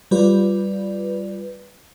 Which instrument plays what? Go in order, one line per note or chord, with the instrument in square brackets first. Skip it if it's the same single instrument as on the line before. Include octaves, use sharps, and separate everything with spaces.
[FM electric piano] G3 F4 B4 D5